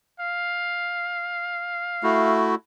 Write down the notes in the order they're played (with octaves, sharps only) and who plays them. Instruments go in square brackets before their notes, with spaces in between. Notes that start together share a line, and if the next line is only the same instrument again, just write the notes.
[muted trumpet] F5
[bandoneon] A3 E4 F#4